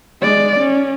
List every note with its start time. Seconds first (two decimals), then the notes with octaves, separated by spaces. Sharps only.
0.22 G#3 D5
0.58 C#4